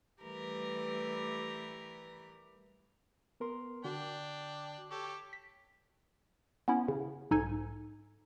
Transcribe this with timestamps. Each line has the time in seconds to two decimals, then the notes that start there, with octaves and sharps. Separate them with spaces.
0.23 E3 G3 A3 G4 A#4 B4
3.40 B3 A#4 C6
3.84 D3 D4 F#4 G5
4.91 G4 A4 C#5
5.33 B6
6.68 B3 C#4 E4
6.88 C#3
7.31 B1 G#2 D#4 A4 G#5 G#6